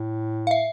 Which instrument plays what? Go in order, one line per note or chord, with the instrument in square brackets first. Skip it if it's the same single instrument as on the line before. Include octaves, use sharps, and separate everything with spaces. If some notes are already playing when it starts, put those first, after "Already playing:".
Already playing: [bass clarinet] A2
[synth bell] F5
E5